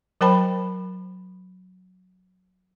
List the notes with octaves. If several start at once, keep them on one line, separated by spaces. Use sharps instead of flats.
F#3 A#4 C5 G5 A5 B5